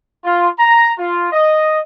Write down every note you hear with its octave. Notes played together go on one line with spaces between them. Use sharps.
F4
A#5
F4
D#5